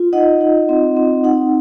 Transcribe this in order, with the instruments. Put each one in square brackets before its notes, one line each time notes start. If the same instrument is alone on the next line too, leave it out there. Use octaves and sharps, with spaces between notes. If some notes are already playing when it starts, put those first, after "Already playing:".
Already playing: [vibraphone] F4
D#4 D#5 F#5
D#4
C4
C4
D#4 F#5